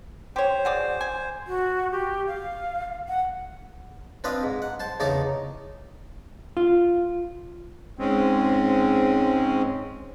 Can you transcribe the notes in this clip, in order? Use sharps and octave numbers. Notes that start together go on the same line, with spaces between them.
G4 C5 C#5
F#4 G#4 D5
G#5
F#4
G4
F5
F#5
C4 D4 B4 D#5 F5
G#2
F#5
C5 A5 C6
E2 C#3 D#4 A5 A#5 D6
F4
G#2 G#3 C4 C#4